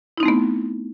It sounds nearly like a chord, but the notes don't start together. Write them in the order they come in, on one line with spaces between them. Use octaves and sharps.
E4 D#4 C4 A3 B3